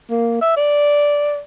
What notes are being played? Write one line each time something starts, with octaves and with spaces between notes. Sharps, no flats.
A#3
E5
D5